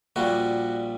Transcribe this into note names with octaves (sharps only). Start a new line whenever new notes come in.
A#1 A#2 G3 F#4